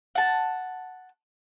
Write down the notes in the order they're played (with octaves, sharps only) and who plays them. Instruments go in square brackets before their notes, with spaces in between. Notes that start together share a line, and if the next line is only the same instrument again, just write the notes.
[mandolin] F#5 A5